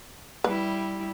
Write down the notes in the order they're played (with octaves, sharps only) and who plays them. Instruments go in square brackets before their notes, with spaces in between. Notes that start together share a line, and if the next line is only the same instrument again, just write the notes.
[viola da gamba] G3 E4 [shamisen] B4